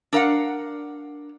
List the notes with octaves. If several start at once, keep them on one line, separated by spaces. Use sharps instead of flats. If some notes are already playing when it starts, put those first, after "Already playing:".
D4 A#4 F5 F#5